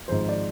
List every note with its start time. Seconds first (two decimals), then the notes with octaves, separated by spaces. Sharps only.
0.08 G#1 G#2 F3 C5
0.29 D5